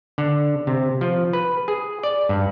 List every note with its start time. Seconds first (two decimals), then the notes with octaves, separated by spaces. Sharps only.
0.18 D3
0.67 C3
1.01 F3
1.33 B4
1.68 G#4
2.03 D5
2.29 G2